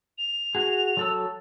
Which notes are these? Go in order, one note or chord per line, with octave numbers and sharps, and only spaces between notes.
F7
F#4 G#4
F#3 A4 E6